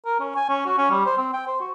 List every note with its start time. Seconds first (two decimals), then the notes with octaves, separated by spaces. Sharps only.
0.05 A#4
0.20 C#4
0.36 G#5
0.49 C#4
0.66 F#4
0.78 C#4
0.91 G3
1.06 C5
1.18 C4
1.33 G5
1.47 C5
1.61 F#4